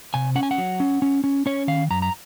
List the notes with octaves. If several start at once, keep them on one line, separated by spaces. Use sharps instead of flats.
C3 G#5
C#4 F#5
G#5
F#5
F#3
C#4
C#4
C#4
C#4 C#5
D#3 F5
F#2 A#5
A#5